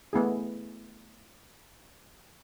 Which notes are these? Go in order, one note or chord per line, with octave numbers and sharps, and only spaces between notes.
A3 B3 E4 G#4